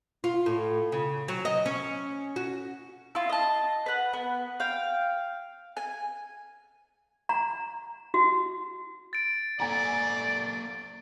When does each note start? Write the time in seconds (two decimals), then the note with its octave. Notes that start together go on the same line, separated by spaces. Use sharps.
0.24 F4
0.46 A2
0.92 C#3
1.28 F#3
1.45 D#5
1.66 C#4
2.36 F#4
3.15 E4 F4
3.29 D#5 A5
3.86 B4 F#5
4.13 B3
4.60 F5 G5
5.77 G#5
7.29 A#5
8.14 F#4
9.13 A6 D7
9.60 A#3 A4 D5 F#5 G#5 A#5